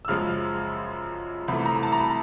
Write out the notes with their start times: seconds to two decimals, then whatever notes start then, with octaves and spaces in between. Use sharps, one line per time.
0.05 E6
0.08 F#2 C#3 F3 G#3 F6
1.48 C2 C3 E3 A3 B5
1.65 A#5
1.83 A5
1.92 A#5
2.00 B5